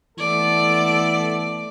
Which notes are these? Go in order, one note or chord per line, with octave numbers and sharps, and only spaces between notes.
E3 A3 B3 A4 D5